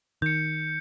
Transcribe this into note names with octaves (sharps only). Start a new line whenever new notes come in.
D#3 G6 C#7